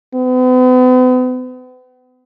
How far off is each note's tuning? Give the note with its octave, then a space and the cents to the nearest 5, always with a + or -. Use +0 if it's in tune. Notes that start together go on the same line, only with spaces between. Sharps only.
B3 +45